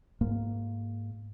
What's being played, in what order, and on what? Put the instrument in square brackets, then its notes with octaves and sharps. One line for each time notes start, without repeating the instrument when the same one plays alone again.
[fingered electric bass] G#2 A#3